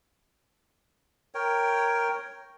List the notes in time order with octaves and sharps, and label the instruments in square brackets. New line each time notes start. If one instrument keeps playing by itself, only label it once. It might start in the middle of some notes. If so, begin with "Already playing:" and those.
[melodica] A#4 C#5 G5